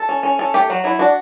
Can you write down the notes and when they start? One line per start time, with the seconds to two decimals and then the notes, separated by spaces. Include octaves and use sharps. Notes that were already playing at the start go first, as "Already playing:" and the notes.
Already playing: A4
0.09 C#4
0.23 C#4
0.39 C#4 A4
0.54 A3 G4
0.70 F#3 F#4
0.84 F#3 E4
0.99 D4 F#4